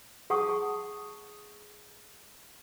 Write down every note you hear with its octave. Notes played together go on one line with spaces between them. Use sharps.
G#4 F#5 A5 C#6 D#6